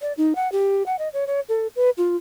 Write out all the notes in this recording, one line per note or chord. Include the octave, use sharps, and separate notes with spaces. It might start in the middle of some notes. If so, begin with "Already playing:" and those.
D5
D#4
F#5
G4
F#5
D#5
C#5
C#5
A4
B4
F4